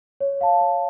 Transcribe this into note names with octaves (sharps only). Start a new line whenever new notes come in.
C#5
F5 A5
C#5